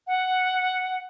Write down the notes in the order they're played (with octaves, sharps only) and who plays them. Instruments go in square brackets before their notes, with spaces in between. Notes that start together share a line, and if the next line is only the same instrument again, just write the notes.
[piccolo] F#5